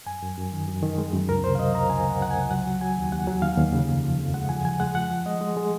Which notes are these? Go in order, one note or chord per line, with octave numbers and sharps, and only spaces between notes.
F#2 G#5
F#2
F#2
D#3
F#2
D#3
G#3
F#2
C#2 A#4
C3 C5
F5
F#3 D#5
C#2 A#5
C#2 G#5
C#2 F#5
C#2 F#5
C#2 G#5
F#3 F#5
F#3
F#3 G#5
D#2
D#2 F#5
F#3
D#2 F5
D#2
C#3
F2
F3
F2
G#3 F#5
F3 G#5
F3 G#5
G#3 F#5
F3 F#5
F3
G#3 D#5
G#3
G#3